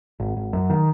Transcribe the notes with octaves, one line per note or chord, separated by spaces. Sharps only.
G#1
G#1
F#2
D#3